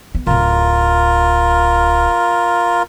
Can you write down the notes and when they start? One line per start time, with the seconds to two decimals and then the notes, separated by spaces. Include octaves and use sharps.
0.15 B3
0.27 D1 D3 F4 A#4